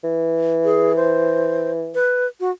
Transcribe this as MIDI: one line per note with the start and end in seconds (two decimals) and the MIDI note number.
0.04 1.95 52
0.64 0.95 68
0.96 1.71 72
1.95 2.27 71
2.40 2.51 66